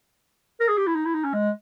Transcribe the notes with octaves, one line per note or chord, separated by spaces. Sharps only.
A#4
G#4
G4
E4
D#4
E4
D#4
C#4
G#3